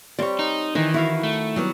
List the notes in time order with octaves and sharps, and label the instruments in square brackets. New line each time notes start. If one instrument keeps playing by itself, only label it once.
[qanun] G3 C4 [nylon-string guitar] C#5 D5
[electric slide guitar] D#4
[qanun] D#3 [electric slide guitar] E3 [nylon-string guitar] D#4
[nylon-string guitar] E4 [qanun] F#4 A#4 F5
[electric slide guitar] A3
[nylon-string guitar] F#3 G3 B3